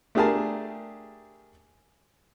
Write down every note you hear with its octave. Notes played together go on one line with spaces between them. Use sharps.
A3 D4 G4 G#4 A#4 A5